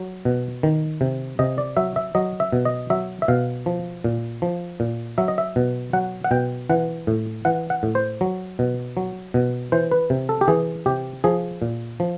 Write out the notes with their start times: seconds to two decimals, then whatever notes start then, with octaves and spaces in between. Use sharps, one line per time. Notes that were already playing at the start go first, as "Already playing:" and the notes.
Already playing: F#3
0.25 B2
0.63 D#3
1.01 C3
1.39 C3 D#5
1.58 D5
1.77 F#3 E5
1.96 E5
2.15 F#3 D#5
2.40 E5
2.53 B2
2.65 D#5
2.90 F#3 E5
3.22 E5
3.28 B2 F5
3.66 F3
4.04 A#2
4.42 F3
4.80 A#2
5.18 F#3 E5
5.28 D#5
5.38 E5
5.56 B2
5.93 F#3 F#5
6.24 F#5
6.31 B2 G5
6.70 E3 F#5
7.07 A2
7.45 E3 F#5
7.70 F#5
7.83 A2
7.95 C5
8.21 F#3
8.59 B2
8.97 F#3
9.34 B2
9.72 E3 C5
9.91 B4
10.10 C3
10.29 A4
10.41 G4
10.48 E3 G#4
10.86 C3 G4
11.24 F3 G#4
11.62 A#2
12.00 F3